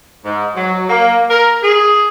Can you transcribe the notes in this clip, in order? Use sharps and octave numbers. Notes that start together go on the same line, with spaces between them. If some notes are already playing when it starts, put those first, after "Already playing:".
G#2
F#3
A#3
A#4
G#4